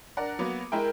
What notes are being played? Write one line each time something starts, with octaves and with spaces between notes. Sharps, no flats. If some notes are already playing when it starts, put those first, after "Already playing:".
D4 A#4 F#5
F#3 A#3 B3
G#3 E4 A#4 G5